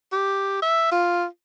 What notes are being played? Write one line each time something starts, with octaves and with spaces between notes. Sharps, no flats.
G4
E5
F4